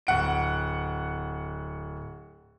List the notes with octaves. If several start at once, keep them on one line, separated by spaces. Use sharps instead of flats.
D1 F#5 D7